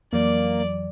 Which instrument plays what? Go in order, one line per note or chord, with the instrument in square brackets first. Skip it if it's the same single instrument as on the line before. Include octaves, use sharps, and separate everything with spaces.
[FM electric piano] F2 E3 F#3 [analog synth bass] A#3 [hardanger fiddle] D5